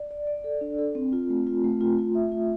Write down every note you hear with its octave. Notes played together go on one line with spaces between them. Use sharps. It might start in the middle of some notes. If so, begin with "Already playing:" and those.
Already playing: D5
D5
D5
A4
D4
A4
C4
F4
A3
F4
A3
F4
F4
E5
F4